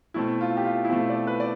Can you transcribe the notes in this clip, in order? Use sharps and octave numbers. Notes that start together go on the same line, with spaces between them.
B2 A3 C4 E4
F4
G4
F4
E4
B2 A3 C4 F4
D5
B4
D5